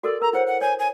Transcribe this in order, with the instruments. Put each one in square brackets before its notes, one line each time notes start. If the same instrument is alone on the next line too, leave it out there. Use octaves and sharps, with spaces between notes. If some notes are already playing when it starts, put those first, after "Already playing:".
[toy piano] F#4 A4 A#4 [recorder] D5
[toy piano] A#4 [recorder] A#5
[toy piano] E4 C5 C#5 [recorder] F#5
[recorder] F#5
[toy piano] C#5 [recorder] G#5
[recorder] G#5